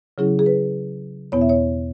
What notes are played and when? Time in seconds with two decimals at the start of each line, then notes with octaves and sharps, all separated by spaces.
0.18 C#3 F#3 C#4 E4 G#4
0.39 G#4
0.46 B4
1.32 E2 B2 B3 E4 C#5
1.41 E5
1.49 C#5